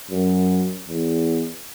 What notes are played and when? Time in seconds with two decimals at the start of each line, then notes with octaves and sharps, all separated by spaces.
0.11 F#2
0.89 E2